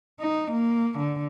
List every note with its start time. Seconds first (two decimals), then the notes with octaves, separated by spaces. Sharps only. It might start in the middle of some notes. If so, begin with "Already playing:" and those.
0.20 D#4
0.52 A#3
0.98 D3